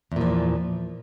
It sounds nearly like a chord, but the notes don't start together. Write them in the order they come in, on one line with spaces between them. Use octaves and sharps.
E2 A#2 F3